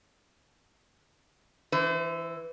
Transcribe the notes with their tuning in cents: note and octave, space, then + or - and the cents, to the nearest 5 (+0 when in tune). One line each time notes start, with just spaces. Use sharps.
E3 +0 C5 -40